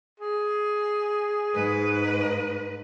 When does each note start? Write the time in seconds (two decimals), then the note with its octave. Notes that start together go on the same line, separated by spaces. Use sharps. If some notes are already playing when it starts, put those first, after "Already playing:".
0.20 G#4
1.54 G#2 B4